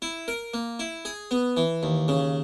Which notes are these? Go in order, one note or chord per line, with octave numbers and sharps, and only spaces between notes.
E4
A#4
A#3
E4
G#4
B3
E3
D#2
C#3